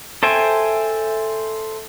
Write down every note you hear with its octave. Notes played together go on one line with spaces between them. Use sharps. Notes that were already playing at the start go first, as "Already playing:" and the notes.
A4 C5 E5 G5 G#5